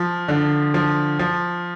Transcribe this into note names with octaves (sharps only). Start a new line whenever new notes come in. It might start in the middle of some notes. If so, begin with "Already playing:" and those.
Already playing: F3
D3
F3
F3